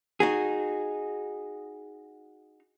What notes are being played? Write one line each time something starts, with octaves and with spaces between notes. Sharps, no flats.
D#4 F#4 G#4